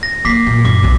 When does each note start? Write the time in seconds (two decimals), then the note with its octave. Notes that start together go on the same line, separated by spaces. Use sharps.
0.03 A#6
0.25 A#3 D6 B6 C7
0.47 A#2
0.65 F#2 D6
0.83 B1 E2